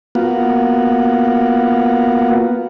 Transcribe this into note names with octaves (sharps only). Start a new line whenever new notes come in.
A#3 B3 F4 F#4